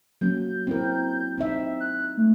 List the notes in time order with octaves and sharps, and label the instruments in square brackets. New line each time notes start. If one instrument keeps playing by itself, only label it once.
[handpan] F#3 A#3 C#4 [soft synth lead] G6
[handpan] C4 E4 A#4
C4 D#4 E5
[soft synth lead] F#6
A3